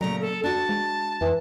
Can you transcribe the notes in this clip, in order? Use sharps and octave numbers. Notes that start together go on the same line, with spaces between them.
A#2 C#3 F#3 A3 A#5
A4
D4 F#4 A5
G#3
F2 E3